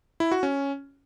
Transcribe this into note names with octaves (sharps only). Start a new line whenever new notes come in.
E4
F#4
C#4